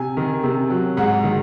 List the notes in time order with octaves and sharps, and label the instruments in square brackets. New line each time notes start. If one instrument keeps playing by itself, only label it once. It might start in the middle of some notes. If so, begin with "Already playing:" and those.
Already playing: [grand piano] C3 G#5
D#3
C3
F#3
G#2 F#5
D#3